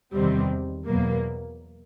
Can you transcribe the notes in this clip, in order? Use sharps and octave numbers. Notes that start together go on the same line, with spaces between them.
E2 C3 D#3 G3 C4
E2 B2 F#3 A#3